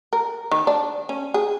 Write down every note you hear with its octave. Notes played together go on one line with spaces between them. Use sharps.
A#4
D#3
D4
C#4
G#4